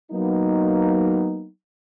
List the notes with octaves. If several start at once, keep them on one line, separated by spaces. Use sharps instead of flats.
F#3 A#3 B3 D#4